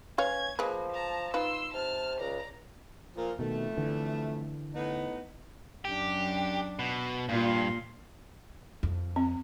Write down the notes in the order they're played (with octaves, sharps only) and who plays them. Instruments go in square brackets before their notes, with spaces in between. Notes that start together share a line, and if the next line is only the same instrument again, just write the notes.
[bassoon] C#4 [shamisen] B4 C#5 F5 [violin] G#6
[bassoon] F3 [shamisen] G#3 B4 [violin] A#3
[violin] A5 A#5
[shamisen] D#4 F4 B4 [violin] C6 E6
[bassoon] C3 [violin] A5 F6
[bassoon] C#2 [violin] D5 A#5
[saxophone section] A#2 F3 A#4
[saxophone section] F2 A3 [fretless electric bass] B2 D#3
[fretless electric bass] D3 E3
[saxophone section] A2 B3 D#4
[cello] F#2 D4 [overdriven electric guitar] G4
[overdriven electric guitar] B2
[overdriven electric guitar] G2 [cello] A#2 F4
[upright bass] F2
[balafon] C4